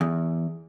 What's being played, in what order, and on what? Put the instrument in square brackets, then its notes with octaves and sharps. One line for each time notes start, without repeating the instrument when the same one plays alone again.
[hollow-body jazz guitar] E2